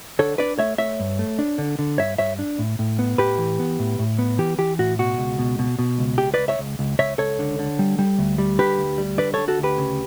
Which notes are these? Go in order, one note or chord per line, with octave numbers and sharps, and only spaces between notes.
D3 A4 C#5
D4 B4 D5
A3 C#5 E5
A3 C#5 E5
G2
A3
D4
D3
D3
G2 C#5 E5
G2 C#5 E5
D4
A2
A2
B3
A2 G4 B4
E3
B3
A2
A2
B3
E3 G4
E3 G4
A2 F#4
B2 F#4
C#2
B2
B2
B2
C#2
C#2 G4
C#2 B4 D5
C#5 E5
C#2
C#2
C#2 C#5 E5
C#2 A4 C#5
D3
D3
G3
G3
D2
G3
D3 G4 B4
D2
G3
D3 B4 D5
D3 A4 C#5
F#4 A4
D2 G4 B4
C#3